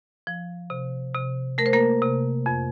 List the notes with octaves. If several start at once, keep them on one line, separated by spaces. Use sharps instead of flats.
F3
C3
C3
A3 A#4
C5
A#3 A#4
C3
F2